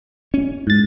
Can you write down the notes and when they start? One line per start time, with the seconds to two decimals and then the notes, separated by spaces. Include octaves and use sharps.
0.34 C#4
0.67 G#2 A6